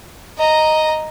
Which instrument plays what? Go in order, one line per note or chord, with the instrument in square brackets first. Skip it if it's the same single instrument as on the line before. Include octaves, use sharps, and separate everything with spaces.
[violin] D#5 A#5